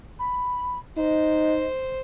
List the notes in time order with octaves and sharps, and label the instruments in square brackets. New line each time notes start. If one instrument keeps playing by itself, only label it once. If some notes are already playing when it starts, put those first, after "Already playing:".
[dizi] B5
[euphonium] D#4 [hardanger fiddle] C5 [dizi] D#5